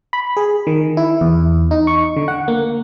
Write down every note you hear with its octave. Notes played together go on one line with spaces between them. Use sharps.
B5
G#4
D#3
E4
E2
D#4
C#6
D3
F#5
A#3